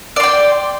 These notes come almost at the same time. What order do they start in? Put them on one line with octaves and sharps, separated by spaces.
D5 C6 G5